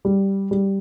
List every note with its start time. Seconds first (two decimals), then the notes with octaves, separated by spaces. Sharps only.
0.05 G3
0.51 G3